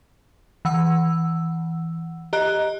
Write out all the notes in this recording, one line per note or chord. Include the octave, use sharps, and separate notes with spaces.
E3 F#5 E6
G4 D#5 A#5 F#6